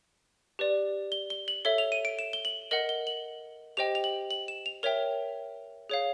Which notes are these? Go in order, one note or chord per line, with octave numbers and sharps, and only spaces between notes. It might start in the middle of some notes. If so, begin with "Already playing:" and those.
G4 B4 D5
G7
G7
F#7
A4 C#5 E5 G7
F7
D#7
D7
E7
G7
F#7
A#4 D#5 F#5 F#7
G7
F#7
G4 C5 D#5 G5 F7
F7
F#7
F#7
E7
F7
A#4 C#5 E5 G5 F7
G#4 C#5 F5